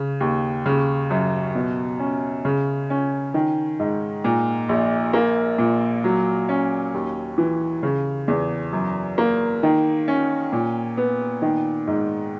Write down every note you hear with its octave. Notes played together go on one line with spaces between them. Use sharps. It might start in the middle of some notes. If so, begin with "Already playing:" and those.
Already playing: C#3
D#2
C#3
F#2
B2
C#4
C#3
C#4
D#3
G#2
A#2
A#1
A#3
A#2
F#3
C#4
D#2
E3
C#3
E2
F#2
A#3
D#3
C#4
A#2
B3
D#3
G#2